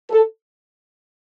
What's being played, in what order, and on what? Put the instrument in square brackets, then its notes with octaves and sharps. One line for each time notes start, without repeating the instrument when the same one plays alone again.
[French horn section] A4